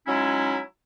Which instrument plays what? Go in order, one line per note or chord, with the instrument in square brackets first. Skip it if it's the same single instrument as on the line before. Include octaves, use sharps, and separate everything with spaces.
[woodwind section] F#3 G#3 C#4 D#4 E4